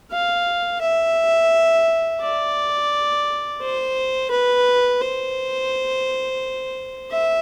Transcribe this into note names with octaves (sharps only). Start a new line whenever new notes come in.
F5
E5
D5
C5
B4
C5
E5